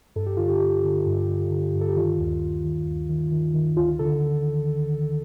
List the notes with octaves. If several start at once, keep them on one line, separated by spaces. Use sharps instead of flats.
G2 A4
G4
D3 F4
G4
D3
D3
G2
D3
D3
G2
A4
G4
D#3 F4
D#2
D#2
D#3
D#2
D#3
D#3
D#3
D2 F4
D3 A4